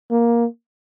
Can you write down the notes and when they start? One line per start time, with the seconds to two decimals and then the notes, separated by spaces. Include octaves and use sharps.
0.11 A#3